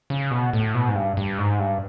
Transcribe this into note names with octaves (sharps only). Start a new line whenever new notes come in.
C#3
B2
A2
B2
G#2
G2
G2
G#2
G2